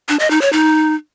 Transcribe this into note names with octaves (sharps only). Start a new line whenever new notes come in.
D4
D#5
D#4
C#5
D#4